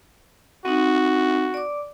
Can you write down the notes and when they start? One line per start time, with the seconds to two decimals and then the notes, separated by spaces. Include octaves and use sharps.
0.65 C4 D#4 F#4
1.54 D5 D6